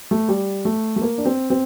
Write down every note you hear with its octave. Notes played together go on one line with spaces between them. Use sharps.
A3
G3
A3
A3
A#3
D4
C4
C4